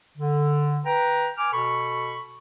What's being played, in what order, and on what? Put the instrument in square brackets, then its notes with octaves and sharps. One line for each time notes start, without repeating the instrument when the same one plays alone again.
[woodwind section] D3
B4 G5 A#5
G#5 D6 F6
B2 A4 B5 C#6